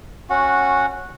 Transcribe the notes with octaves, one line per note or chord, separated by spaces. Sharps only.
C#4 F#4 F#5